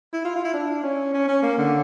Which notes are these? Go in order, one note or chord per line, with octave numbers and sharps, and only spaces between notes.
E4
F4
F4
E4
D4
C#4
C#4
C#4
A#3
D3